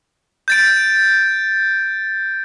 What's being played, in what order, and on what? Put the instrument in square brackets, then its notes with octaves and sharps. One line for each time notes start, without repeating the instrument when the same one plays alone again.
[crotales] G6 A6 D7